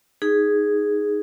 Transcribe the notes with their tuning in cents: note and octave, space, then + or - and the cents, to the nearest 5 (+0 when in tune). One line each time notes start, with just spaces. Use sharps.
D#4 +0 G#4 +0